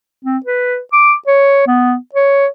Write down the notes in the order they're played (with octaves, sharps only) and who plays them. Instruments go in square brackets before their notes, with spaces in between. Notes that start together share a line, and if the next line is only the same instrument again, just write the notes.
[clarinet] C4
B4
D6
C#5
B3
C#5